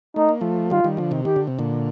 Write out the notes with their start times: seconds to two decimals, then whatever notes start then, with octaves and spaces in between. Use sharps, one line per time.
0.16 A3 D#4
0.29 A#3
0.41 F3 A3
0.70 D#3 G3 F4
0.84 D#3 G3
0.97 D3 F3
1.11 C3 D#3
1.25 D#3 G4
1.36 D3
1.47 C3
1.59 A#2 D3